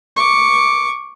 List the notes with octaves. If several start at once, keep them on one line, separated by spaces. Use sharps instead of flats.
C#6 D6